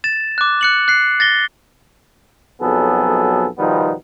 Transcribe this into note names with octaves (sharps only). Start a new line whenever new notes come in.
A6 E7
D6 F#6
F#6 C#7 F#7
F#6 C7
A6 A#6 G7
B1 F2 F#3 B3 G#4 A4
B2 D#3 F3 G3 B3 D#4